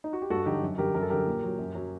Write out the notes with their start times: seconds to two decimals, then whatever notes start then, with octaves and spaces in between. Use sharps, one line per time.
0.04 D#4
0.13 F#4
0.22 G4
0.30 G2 F#4 A4
0.46 D3 F#3 D#4 G4
0.62 F#2
0.78 D3 G3 G4 A#4
0.94 F#2 A#4
1.02 A4
1.10 D3 G3 G4 A#4
1.27 A#2
1.43 F#3
1.59 F#2
1.75 F#3